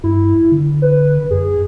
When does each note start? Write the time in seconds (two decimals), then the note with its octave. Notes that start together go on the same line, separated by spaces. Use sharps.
0.04 G2 E4
0.52 D3
0.82 B4
1.31 F#2 G#4